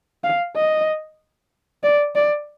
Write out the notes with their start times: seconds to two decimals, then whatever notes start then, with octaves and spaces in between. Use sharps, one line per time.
0.24 F5
0.56 D#5
1.83 D5
2.15 D5